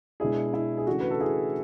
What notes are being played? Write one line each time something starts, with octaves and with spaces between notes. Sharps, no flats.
B2 G#3 D4 E4 G#4
E4
G#4
C#3 E3 A3 D4 F#4
B4
A4
E4 G#4